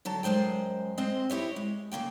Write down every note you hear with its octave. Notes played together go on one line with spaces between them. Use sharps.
D3 F#3 A5
F#2 F#3 G#3 C5 G5
G#3 C4 C5 D#5
E4 G4 C#5 D#5
G#3
C#3 A3 A#3 G5